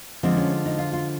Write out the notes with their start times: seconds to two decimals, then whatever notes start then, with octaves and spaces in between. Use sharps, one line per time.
0.23 D3 F3 G#3 C4
0.37 C#4
0.65 D#4
0.79 F4
0.93 F4